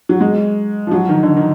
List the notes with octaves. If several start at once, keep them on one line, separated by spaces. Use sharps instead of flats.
F#3
G#3
F3
F#3
D#3
D3
D#3